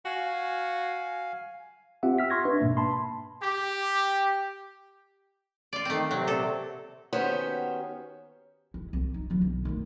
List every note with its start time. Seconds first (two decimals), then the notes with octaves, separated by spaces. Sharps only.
0.05 F#4 F5 G#5
2.03 C4 F4 G4 E5 F#5
2.19 E6 F6 B6
2.30 C6 C#6 G#6 A#6
2.45 D4 B4 E5
2.61 G#2 B2 A#3
2.77 A5 B5 C6
3.42 G4
5.73 F4 D5
5.85 D#3 A3 C4
6.11 C3 F#3
6.27 A#2 A4
7.13 D#3 B3 C#4 F#4 G4 C5
8.74 E4
8.93 C2
9.14 D#4
9.30 D3 F#3
9.41 B1
9.65 D#3 A3